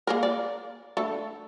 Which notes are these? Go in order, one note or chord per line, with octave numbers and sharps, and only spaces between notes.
A#3 G#4 A#4
D5
A3 D4 A4